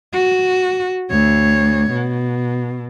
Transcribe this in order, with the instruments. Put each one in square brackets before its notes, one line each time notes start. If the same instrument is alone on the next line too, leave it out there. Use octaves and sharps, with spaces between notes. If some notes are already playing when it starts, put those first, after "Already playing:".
[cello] F#4
D2 C#5
B2